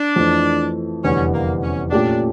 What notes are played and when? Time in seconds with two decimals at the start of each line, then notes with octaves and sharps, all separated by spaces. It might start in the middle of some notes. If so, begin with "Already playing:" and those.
Already playing: D4
0.16 F2 E3 A3
1.04 F1 E2 D3 G3 C#4
1.33 A#3
1.62 C#4
1.91 A#2 A3 C#4 D4 G4 D5